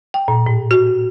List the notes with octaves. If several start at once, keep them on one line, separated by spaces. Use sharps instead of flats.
G5
A#2
A2
F#4